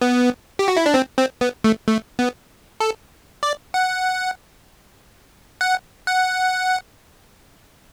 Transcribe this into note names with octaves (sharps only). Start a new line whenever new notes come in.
B3
G4
F#4
E4
D4
C4
C4
B3
A3
A3
B3
A4
D5
F#5
F#5
F#5